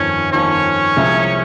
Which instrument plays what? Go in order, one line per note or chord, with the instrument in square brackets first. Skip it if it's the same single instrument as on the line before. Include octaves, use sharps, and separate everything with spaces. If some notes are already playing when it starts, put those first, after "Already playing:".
Already playing: [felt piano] G1 F2 D#3 [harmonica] C#4 C#5
[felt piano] G1 F2 D#3 [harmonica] C#4 C#5
[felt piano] C2 C3 F3 G#3